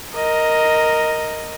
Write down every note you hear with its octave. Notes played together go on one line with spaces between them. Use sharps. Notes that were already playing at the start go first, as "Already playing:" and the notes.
A#4 D#5